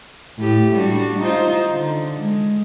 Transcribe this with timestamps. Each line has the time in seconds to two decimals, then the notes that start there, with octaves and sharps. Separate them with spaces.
0.38 A2 G4
0.75 G3 D4 F#4
1.18 D#4 F4 C5
1.71 D3
2.20 G#3